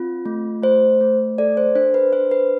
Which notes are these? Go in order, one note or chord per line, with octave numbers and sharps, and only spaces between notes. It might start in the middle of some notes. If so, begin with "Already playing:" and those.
Already playing: C4 F4
A3
A3 C5
A3
A4 D5
C5
D4 C5
B4
D4 C5
B4